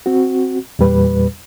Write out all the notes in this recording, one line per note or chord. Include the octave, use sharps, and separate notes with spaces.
C4 F#4
E2 A#2 G3 B4